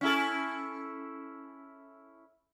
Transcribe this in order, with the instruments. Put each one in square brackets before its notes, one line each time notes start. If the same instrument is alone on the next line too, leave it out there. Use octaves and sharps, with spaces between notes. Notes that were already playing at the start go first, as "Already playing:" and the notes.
[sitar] C#4 E4 A4